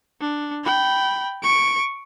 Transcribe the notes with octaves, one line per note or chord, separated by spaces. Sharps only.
D4
G5 B5
C#6 D7